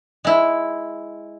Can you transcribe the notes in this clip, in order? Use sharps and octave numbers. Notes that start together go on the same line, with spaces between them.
G#3 E4